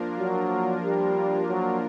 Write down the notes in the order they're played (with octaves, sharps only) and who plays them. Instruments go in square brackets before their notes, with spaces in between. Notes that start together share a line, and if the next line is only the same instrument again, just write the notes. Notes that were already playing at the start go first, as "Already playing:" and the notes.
Already playing: [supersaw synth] F3 A#3 D4 F4 A#4
[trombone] F#3
G3
F#3